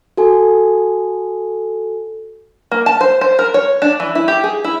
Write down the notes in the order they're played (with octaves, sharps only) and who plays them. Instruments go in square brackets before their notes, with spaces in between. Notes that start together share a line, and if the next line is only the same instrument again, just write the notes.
[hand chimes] F#4 A4 G#5
[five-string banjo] A#3
A5
C5
C5
A#4
C#5
D4
E3
E4
G4
G#4
E4